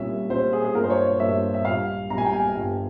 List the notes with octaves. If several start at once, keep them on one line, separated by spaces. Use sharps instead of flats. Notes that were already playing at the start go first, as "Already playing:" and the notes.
Already playing: C2 A#2 G3 C#4 E5
C2 A#2 G3 C#4 C5
G#4
G#4
G2 F3 A#3 F4 A#4
C5
C#5
C#5
G2 F3 A#3 F4 E5
E5
A#1 A#2 G3 F5
A#1 A#2 G3 G#5 A#5
G5
G#5
G1 G2 F3